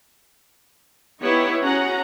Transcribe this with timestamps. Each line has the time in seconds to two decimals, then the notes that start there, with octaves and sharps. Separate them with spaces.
1.22 B3 D#4 E4 G4 C#5
1.62 C#4 F#4 G#4 F#5 A#5